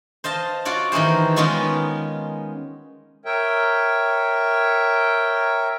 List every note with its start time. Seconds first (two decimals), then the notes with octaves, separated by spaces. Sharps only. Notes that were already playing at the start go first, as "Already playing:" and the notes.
0.24 C5 D#5 F5 A5
0.65 F4 F#4 C#5 D5
0.92 D#3 E3 A#3 G#4 C5
1.36 D#3 G#3 B3 C#4 F4 G#4
3.25 A#4 C#5 E5 G5